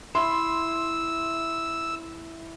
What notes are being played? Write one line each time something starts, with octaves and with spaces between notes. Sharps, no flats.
E4 C6 E6